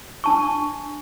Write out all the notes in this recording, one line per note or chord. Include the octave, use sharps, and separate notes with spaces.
D4 A5 C#6